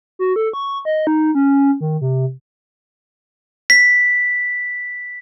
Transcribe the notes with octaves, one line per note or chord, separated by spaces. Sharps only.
F#4
A4
C#6
D#5
D#4
C#4
D#3
C3
B6